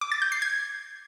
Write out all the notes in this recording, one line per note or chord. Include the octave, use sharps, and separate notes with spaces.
D6
A6
G6
C7
G#6